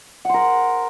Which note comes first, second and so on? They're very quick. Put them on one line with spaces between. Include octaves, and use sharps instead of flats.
F#5 C5 A#4